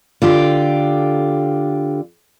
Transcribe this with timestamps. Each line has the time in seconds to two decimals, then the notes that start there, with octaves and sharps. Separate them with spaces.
0.22 D3 F4 G4